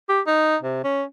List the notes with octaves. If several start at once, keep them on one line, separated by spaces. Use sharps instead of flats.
G4
D#4
C3
C#4